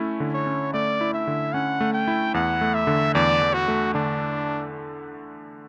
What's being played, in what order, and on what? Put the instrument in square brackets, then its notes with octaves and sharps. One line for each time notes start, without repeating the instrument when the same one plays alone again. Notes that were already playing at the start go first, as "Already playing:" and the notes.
Already playing: [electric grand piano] A3 C#4 E4
D3
[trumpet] C#5
[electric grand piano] C#4
[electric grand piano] A3 [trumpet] D5
[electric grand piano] E4
[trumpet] E5
[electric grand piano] D3
[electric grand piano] C#4 [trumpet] F#5
[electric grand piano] A3
[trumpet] G5
[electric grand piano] E4
[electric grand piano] E2 [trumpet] F#5
[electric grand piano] A3
[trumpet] E5
[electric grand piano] D3
[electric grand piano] E2 [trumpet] D5
[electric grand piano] E2
[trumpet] F#4
[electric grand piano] A3
[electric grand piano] D3 [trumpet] D4